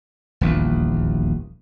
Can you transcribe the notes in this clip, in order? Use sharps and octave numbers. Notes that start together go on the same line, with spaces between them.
D#1 A#1 E2